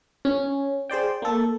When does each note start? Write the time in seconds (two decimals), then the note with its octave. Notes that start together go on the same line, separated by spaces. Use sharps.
0.25 C#4
0.90 G#4 C5 D5 G5
1.22 A#3 A4